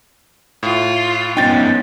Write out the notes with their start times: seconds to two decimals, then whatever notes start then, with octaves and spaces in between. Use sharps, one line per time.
0.63 A2 F4
1.37 B3 C#4 D#4 G5 A6